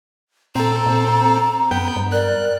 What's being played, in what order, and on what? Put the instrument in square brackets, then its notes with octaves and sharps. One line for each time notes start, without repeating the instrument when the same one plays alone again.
[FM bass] A#2 [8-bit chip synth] C4 A4 [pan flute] A#5
[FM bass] A#2
[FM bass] F#2 [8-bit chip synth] B3 G5 G6
[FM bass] G2
[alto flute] A#4 [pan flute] D5 [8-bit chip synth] F#6